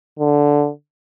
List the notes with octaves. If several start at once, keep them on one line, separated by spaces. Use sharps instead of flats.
D3